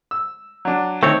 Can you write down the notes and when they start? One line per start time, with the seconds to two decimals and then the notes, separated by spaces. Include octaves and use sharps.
0.11 E6
0.65 F#3 D4
1.03 D#3 A3 C4 C#5